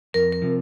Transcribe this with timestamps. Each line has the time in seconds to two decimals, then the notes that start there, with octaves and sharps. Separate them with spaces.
0.14 F2 A#4
0.32 A#4
0.42 C3 F3